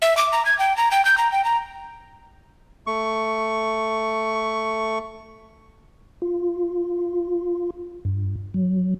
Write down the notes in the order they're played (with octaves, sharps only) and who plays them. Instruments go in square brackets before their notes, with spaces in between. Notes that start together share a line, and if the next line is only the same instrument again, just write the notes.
[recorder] E5
D6
A#5
G#6
G5
A#5
G5
G6
A#5
G5
A#5
[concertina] A3 C#6
[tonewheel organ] F4
G2
F#3